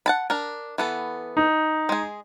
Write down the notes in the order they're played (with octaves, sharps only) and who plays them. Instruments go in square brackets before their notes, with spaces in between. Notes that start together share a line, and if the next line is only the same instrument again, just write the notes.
[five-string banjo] F#5 A5 B5
D4 A#4
E3 B3 A4
[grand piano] D#4
[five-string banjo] G#3 G#4